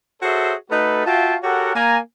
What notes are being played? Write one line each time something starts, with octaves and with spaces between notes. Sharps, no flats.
F#4 G#4 A4 C5 C#5 E5
A3 D#4 F#4 A4 B4
F4 F#4 E5 F5 G5 A5
F#4 G4 A4 A#4 C#5 F#5
A#3 G#5 A#5